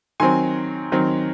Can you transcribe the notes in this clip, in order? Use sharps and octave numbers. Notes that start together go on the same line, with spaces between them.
D#3 F#3 C4 G#5 C6
D#3 F#3 C4